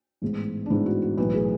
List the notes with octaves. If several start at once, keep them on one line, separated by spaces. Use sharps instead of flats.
A1 G#2 G#3 B3
D4
A1 G#2 G#3 B3 E4
F#4
F#4
B1 A2 E3 B4
G#4